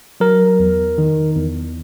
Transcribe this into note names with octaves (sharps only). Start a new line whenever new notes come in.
F#3 A#4
E2
D#3
E2